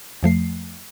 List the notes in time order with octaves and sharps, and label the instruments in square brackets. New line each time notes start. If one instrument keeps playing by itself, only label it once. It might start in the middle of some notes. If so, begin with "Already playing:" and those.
[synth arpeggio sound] F2 F3 A3 C7